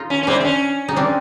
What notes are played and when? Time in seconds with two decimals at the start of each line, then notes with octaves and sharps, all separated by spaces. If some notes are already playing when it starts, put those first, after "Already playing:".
Already playing: D#4 F4
0.10 C#4
0.23 C#4
0.27 C4 D4 E4
0.41 C4
0.45 C#4
0.88 D#4
0.96 C4 D4